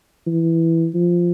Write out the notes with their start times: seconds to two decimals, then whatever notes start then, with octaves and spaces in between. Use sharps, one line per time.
0.27 E3
0.95 F3